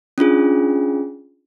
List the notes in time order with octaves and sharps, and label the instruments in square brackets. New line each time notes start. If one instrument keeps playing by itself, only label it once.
[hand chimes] C#4 D4 F4 G#4